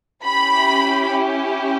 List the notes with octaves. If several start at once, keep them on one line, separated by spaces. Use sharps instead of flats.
C#4 E4 G4 B5